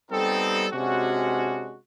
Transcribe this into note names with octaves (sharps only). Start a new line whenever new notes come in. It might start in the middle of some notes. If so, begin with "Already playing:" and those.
G3 B3 C4 D#4 G4 A4
C3 G#3 C#4 D4 F#4